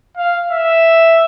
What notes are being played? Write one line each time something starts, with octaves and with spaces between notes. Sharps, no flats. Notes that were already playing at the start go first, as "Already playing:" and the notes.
F5
E5